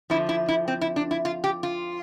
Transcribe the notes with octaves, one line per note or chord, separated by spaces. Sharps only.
F2 D3 F3 E4
E4
E4
C4
E4
D4
E4
F4
G4
F4